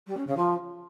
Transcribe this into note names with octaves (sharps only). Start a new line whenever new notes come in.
G3
C#4
C#3
F3